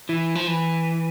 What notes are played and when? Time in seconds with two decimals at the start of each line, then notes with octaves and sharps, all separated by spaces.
0.09 E3
0.35 F3
0.47 E3